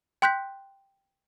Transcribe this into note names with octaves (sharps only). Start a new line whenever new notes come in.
G5 C6 F#6 G6 B6